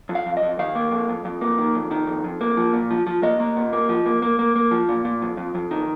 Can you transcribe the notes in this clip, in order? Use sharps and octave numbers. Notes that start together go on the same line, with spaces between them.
F2
F5
F2
D#5
F2
D#3 F5
A#3
F2
F2
F2
A#3
D#3
F2
D#3
F2
F2
A#3
F3
A#2
F3
F3
A#3 D#5
A#3
A#2
A#3
F3
A#3
A#3
A#3
A#3
F3
A#2
A#2
F2
F2
F2
D#3